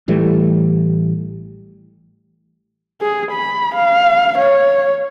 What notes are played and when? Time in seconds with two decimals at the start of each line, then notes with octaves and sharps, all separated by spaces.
0.08 A1 E3 G3 A3
3.01 G#4
3.32 B5
3.76 F5
4.38 C#5